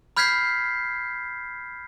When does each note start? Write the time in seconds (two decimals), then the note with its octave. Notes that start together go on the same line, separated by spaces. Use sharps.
0.17 B5 F6 G6 G#6 B6 C7